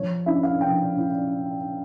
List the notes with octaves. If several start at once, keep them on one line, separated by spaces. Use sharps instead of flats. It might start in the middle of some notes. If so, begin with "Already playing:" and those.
Already playing: F3 C#5
C#4 E4 E5
F5
F3 G5
C#4 E4